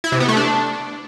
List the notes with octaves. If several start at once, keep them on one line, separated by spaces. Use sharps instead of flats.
E4
C3
B3
A3
D4